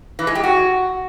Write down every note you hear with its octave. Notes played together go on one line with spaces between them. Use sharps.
E3
G#3
G4
F#4